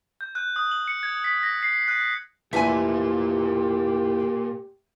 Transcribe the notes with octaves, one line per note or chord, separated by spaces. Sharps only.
G6
F#6
D#6
F#7
C#7
G#6
B6
A#6
C7
F#6
F1 A#2 E3 G4 E5 G#5 A5